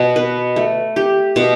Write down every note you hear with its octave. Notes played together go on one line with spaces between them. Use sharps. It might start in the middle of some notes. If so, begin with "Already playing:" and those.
Already playing: B2
B4
A3
G4
B2